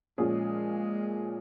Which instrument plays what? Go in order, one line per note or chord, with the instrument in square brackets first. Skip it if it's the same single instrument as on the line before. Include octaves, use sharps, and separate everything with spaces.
[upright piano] A#2 F3 C#4 F4 G#4 [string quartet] G#3